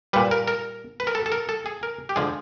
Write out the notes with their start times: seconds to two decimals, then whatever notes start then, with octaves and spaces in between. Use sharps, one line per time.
0.13 A#2 G3 B4
0.31 A#4
0.48 A#4
1.00 B4
1.07 A#4
1.15 A4
1.26 A4
1.32 A#4
1.49 A4
1.66 G#4
1.83 A#4
2.09 G4
2.16 D3 F3 G#3 G#4